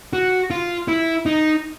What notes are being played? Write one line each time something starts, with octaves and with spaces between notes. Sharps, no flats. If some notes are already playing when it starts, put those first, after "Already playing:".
F#4
F4
E4
D#4